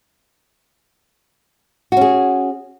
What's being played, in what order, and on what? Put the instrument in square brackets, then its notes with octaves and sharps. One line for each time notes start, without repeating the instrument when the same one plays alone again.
[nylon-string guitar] F#4
C#4
G#4